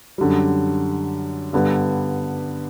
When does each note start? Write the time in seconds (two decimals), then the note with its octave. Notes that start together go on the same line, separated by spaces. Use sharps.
0.18 F#2 D3 G3
1.53 G2 D3 G3 B3